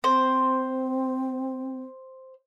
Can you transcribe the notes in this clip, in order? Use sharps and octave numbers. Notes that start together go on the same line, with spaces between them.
C4 C5